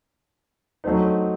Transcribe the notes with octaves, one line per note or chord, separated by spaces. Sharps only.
F#3 A3 C4 D#4